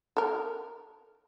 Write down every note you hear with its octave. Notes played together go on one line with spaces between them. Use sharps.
A4 A#4